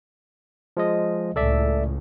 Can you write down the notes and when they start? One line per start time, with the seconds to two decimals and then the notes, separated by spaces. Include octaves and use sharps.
0.77 F3 G#3 D#5
1.36 C#2 A2 A4 D5 E5